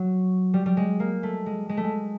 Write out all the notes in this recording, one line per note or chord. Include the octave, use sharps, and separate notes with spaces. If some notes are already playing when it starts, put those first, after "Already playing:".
Already playing: F#3
G3
G3
G#3
A#3
A3
G#3
G#3
A3
G#3